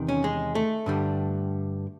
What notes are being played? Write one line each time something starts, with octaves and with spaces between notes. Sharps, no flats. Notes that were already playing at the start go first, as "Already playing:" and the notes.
Already playing: E2 C3 D#3
C#4
G#3
A3
G2 D3 G3